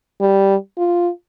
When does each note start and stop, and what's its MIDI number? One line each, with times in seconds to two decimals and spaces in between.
0.21 0.55 55
0.78 1.10 65